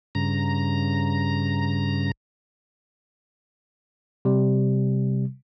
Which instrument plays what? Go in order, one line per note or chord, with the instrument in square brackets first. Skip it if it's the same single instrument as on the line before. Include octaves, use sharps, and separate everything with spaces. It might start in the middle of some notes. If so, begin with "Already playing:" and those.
[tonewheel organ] G2 C#3 A#5
[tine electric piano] C3 G3